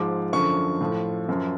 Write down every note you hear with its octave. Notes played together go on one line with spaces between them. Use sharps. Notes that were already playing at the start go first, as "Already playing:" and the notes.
Already playing: G#2 F3 D6
F#2 D3 F3 C#6
A2 F3
F#2 F3